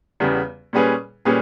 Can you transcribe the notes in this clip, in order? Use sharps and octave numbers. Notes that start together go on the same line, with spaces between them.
E2 C#3 G3 B3
A#2 G3 C#4 G#4 B4
A#2 G3 C#4 G#4 B4